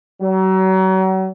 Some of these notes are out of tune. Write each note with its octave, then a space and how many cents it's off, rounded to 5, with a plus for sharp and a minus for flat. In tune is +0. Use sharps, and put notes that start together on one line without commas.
F#3 +35